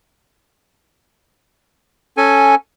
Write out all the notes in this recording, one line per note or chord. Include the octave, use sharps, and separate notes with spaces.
C#4 A4 G#5